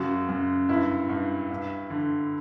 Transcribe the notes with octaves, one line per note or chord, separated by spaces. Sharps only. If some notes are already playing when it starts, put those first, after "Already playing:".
Already playing: F#2 C#3 F#4
F#2
G2 E4
G2
G2
D3